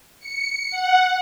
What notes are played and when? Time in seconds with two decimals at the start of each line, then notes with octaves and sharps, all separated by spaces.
0.20 C#7
0.71 F#5